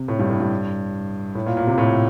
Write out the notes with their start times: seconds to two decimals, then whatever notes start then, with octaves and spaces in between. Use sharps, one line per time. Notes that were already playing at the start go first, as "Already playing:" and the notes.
Already playing: C3
0.08 A2
0.19 G2
0.30 A2
0.40 G2
1.35 A2
1.46 A#2
1.57 A#2
1.67 C3
1.78 A2